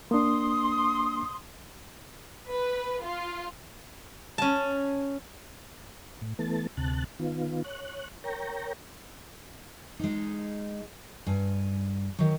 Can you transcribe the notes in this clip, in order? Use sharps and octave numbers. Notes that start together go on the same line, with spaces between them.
A#3 D4 C6 D#6
B4
F4
C#4 A5
A2
E3 A3 B3 A5
D2 C3 A5 F#6
D#3 B3 F4
C#5 F#6
A#4 C#5 G5 A#5
G#3 D#4
G2 G#5
D#3 F#3